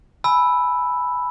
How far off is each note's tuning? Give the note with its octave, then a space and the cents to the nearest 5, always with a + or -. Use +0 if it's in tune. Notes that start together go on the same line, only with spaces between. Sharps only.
G#5 +20 B5 +0 E6 +0